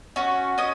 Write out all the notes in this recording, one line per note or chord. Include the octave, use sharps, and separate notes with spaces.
C#4 F#4
C#4 D#5